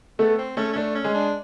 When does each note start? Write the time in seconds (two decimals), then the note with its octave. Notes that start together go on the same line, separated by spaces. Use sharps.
0.19 A3 B3 A4
0.38 C4
0.57 A3 C#4 A4
0.72 C#4
0.76 A3 D4 A4
0.95 C#4
1.04 G#3 G#4
1.14 D4